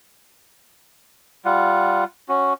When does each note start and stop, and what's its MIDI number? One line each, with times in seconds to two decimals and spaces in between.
1.45 2.04 55
1.45 2.04 65
1.45 2.04 78
2.29 2.53 61
2.29 2.53 66